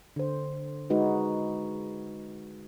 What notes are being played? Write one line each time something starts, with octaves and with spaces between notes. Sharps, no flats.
D3 C5
G#3 D#4 F#4 B4